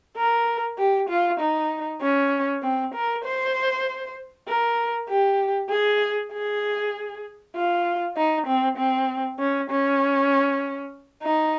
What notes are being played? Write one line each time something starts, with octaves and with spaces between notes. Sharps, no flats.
A#4
G4
F4
D#4
C#4
C4
A#4
C5
A#4
G4
G#4
G#4
F4
D#4
C4
C4
C#4
C#4
D#4